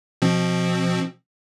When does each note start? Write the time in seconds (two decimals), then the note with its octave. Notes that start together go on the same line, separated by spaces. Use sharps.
0.22 B2 F3 C4